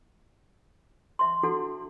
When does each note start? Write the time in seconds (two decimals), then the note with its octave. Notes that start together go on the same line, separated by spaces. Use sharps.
1.19 E5 C6
1.43 D4 E4 F#4 A4 F#5